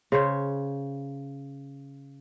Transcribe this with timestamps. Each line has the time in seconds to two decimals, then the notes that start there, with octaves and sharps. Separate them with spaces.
0.12 C#3 C5 C#5